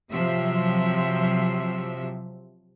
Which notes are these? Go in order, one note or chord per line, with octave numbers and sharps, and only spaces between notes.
C3 F3 F#3 E5